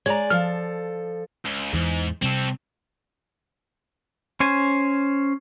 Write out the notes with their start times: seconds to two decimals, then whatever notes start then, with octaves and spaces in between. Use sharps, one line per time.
0.06 G#3 C#5 D5 A#5
0.30 F3 A4 F6
1.45 C#2
1.74 E2 G#2 E3
2.22 C3 G3 C4 A4
4.40 C#4 C5 G#5